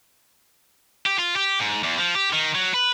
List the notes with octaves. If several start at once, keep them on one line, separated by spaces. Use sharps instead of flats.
G4
F4
G4
G#2
E2
F3
G4
D#3
F#3
B4